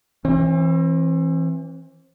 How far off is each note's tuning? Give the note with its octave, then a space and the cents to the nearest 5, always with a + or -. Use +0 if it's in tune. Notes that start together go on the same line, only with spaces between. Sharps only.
E3 +0 C4 +40